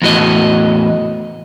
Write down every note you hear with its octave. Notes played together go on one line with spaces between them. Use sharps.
E2 A2 F#4 D#5